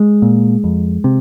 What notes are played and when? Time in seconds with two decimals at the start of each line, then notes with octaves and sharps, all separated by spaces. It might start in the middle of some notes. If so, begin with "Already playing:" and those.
Already playing: G#3
0.22 A#2
0.64 F2
1.04 C3